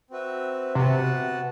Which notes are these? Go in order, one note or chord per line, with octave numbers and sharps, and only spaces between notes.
C4 F#4 B4 E5
C3 B3 F#4 B4 F#5 A5